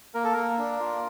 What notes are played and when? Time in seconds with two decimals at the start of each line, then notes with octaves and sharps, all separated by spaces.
0.15 A#3 A#4
0.24 A4
0.33 A#3 A#4
0.58 D4
0.80 F4